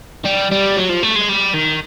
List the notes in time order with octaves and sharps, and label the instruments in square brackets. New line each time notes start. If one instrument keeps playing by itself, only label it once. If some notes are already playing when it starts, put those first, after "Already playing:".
[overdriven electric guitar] G3
G3
F#3
F3
A3
G#3
G3
D#3